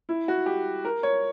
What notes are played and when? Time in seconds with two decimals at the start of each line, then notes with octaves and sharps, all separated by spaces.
0.09 E4
0.28 F#4
0.46 G4
0.85 A#4
1.03 C#5